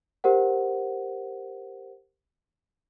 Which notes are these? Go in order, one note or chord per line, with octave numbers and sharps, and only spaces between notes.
G4 A#4 C5 F#5